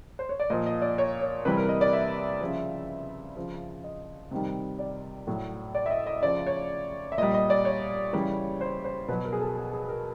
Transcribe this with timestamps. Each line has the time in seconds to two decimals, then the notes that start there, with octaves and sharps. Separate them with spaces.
0.19 C5
0.29 C#5
0.40 D5
0.50 A#2 F3 D#5
0.66 D#5
0.82 D5
0.98 C#5
1.21 C#5
1.45 C3 E3 G3 B4
1.57 A#4
1.69 D#5
1.81 D5
1.93 E5
2.41 C#3 F3
3.36 C#3 F3
3.84 D#5
4.31 C3 D#3 G3
4.79 D5
5.27 A2 F#3
5.75 D5
5.86 E5
5.91 D#5
6.07 D#5
6.22 C#3 F3 D5
6.46 C#5
7.12 E5
7.18 A#2 G3 D#5
7.34 D#5
7.50 D5
7.65 C#5
8.13 C#3 E3 G3
8.61 C5
8.85 C5
9.08 B2 F#3 B4
9.25 A#4
9.33 G#4
9.41 A4
9.57 G#4
9.73 G#4
9.88 A#4